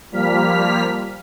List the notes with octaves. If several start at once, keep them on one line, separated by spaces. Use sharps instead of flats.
F3 G3 A#3 F6 B6